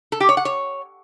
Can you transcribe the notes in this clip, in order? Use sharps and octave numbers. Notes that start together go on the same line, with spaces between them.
A4
G4
C#5
F#5
C#5